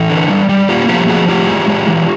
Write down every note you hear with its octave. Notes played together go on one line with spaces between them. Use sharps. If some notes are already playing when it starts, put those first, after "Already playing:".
Already playing: E3 A4 B4
D3
G3
G3
A#3 F4 G4
F3 F4 G4
F3 F#4 G#4
A2 F4 G4
G#3
G#3
E3